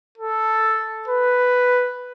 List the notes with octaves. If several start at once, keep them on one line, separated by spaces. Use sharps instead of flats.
A4
B4